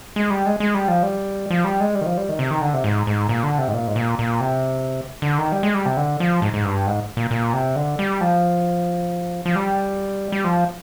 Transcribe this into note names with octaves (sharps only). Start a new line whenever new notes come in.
G#3
G3
G#3
G#3
G3
F3
G3
F3
G3
G#3
G3
D#3
F3
G3
D#3
C3
D#3
D3
C3
G#2
G#2
A#2
D3
C3
G#2
A#2
G#2
A#2
A#2
C3
D3
D#3
G3
G#3
G3
C3
D3
F3
G#2
G#2
G2
G#2
A#2
A#2
C3
D3
G3
F3
F3
G3
G3
F3